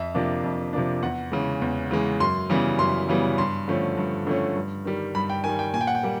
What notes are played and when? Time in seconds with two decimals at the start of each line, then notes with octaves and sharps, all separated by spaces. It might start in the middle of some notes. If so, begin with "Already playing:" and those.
Already playing: F2 E5
0.15 C3 F3 A#3 D4
0.44 F2
0.73 C3 F3 A#3 D4
1.02 E2 F#5
1.32 C#3 E3 G#3
1.62 E2
1.91 C#3 E3 G#3
2.20 F#2 C6
2.50 C#3 E3 G3 B3
2.79 F#2 C6
3.09 C#3 E3 G3 B3
3.38 G2 C6
3.68 D3 F3 A3 C#4
3.97 G2
4.27 D3 F3 A3 C#4
4.56 G2
4.85 D#3 G3
5.15 G2 B5
5.30 G5
5.44 D#3 G3 G#5
5.59 G5
5.74 A#2 G#5
5.81 G5
5.87 F#5
5.95 G5
6.03 G3 A#3